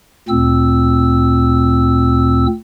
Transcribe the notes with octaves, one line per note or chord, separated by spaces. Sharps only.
D2 A#2 C4 E6